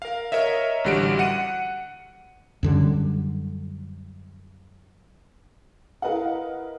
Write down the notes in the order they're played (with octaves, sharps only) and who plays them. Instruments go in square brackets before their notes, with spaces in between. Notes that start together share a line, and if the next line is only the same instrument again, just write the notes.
[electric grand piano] A#4 F5
A#4 C#5 D#5 E5
A1 D3 G3 F#4 D7
F#5 C#7 D#7
[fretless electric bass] F#2 D3 G3
[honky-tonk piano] E4 A#4 B4 D#5 F5 F#5